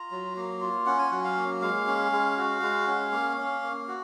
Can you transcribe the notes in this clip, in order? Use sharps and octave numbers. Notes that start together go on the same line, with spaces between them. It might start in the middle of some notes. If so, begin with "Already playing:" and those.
Already playing: F4 A#5
F#3
A#3
F4
C#4 F#5
G#5
F#3 F#5
F5
A#3
G#3 F5
C#4
G#3
F#4
G#3
C#4
A#3
C#4
A#3
F#4